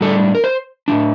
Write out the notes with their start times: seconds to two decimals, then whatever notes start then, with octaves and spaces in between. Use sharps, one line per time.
0.01 A2 G3 D4 A4
0.35 A#4
0.44 C5
0.88 A2 G3 D4